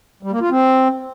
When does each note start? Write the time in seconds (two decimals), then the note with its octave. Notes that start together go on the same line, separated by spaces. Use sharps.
0.23 G3
0.32 A#3
0.41 F4
0.50 C4